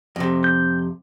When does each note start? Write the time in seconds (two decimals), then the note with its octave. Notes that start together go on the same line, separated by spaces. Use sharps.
0.16 F2 C3
0.44 G6